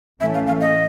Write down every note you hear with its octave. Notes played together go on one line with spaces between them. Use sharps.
A2 E3 A3 C#4 E5
F5
F5
D#5